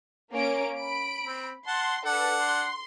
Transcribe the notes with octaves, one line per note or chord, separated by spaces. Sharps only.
A#3 C#4 D7
B5 D7
C4
F#5 A5 C6
D4 A4 B4 F#5
C6